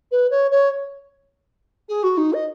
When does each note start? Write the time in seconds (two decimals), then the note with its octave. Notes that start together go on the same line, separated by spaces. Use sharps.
0.11 B4
0.30 C#5
0.51 C#5
1.89 G#4
2.03 F#4
2.17 D#4
2.33 D#5